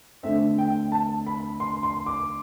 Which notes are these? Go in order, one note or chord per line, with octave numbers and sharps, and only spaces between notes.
D3 A3 C4 E5
G5
A5
B5
C6
C6
D6